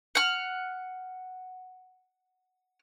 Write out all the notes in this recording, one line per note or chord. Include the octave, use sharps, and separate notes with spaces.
F#5 F6